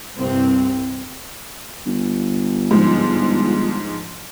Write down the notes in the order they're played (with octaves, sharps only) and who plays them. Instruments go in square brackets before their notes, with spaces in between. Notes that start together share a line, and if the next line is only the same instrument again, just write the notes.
[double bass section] C2 G2 C4
[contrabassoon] G1
[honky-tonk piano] G#2 F3